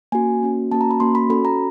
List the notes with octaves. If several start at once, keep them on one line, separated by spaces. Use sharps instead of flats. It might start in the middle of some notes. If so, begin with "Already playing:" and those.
A#3 C#4 F#4 G#5
A#3 C#4 F#4
A#3 C#4 F#4 A5
A#5
B5
A#3 C#4 F#4 C6
B5
C#4 F#4 A4 B5
A#5